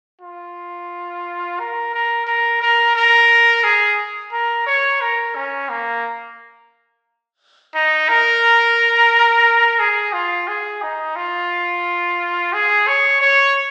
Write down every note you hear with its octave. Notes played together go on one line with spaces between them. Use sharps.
F4
A#4
A#4
A#4
A#4
A#4
G#4
A#4
C#5
A#4
C#4
A#3
D#4
A#4
G#4
F4
G#4
D#4
F4
G#4
C#5
C#5